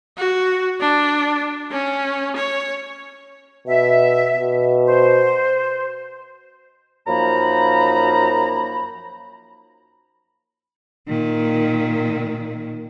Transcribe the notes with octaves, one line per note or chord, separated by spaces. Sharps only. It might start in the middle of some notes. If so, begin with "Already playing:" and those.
F#4
D4
C#4
C#5
B2 E5
B2
C5
F#2 F3 A#3 D#4 A#5 B5
A#2 D#3